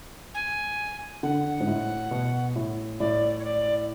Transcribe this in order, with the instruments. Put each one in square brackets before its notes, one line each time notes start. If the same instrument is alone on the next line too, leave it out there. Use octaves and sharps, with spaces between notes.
[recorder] G#5
[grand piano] D3 [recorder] F#5
[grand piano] G#2
A2
B2
A2
[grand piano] A2 [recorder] D5
[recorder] C#5
D5